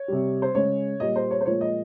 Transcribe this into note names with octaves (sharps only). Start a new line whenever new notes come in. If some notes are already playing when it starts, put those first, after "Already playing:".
Already playing: C#5
C3 G3
C5
C#3 G#3 C#5
A#2 G3 D#5
C5
C#5
C5
A#2 F3 G#3 C#5
D#5